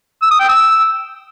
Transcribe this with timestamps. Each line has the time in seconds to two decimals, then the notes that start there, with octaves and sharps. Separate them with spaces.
0.22 E6
0.31 D#6
0.40 G5
0.49 E6